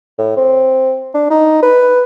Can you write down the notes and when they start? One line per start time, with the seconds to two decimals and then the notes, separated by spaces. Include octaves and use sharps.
0.18 A2
0.37 C4
1.14 D4
1.30 D#4
1.62 B4